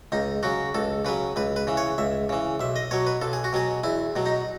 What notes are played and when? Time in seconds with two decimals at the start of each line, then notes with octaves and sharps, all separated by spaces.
0.12 C#2 D#4
0.43 C#3 F#3 F#4
0.75 C#2 A4
1.05 C#3 F#3 B4
1.36 C#2 B4
1.56 B4
1.67 C#3 E3
1.77 C#5
1.98 C#2 E5
2.29 C#3 E3
2.60 B1 E5
2.76 D#5
2.91 B2 F#3 C#5
3.07 B4
3.22 B1 A4
3.33 G#4
3.44 F#4
3.53 B2 F#3 G#4
3.83 E2 E4
4.16 B2 F#3
4.26 D#4